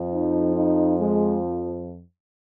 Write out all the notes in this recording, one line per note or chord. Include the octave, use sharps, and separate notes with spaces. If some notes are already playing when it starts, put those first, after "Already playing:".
Already playing: F2 F3
D#4
D#4
G#3